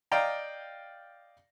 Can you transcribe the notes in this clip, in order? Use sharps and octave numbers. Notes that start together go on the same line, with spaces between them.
D5 D#5 F5 G5 A#5